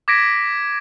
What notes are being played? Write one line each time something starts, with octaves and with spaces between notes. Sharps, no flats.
D6 G#6 A#6 B6 D7